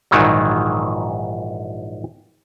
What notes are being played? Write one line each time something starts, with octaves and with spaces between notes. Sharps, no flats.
A#1 G#2 D#3 E3 F#3